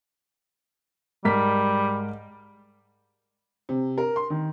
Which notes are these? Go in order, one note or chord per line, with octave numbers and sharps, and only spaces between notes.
G#2 G3 A#4 B6
C3
A#4
C6
D#3